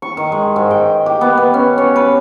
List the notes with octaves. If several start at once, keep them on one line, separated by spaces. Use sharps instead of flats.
C#6
D#3
G#3
G#2
G5
G4
B3
B3
C#4
C#5
B4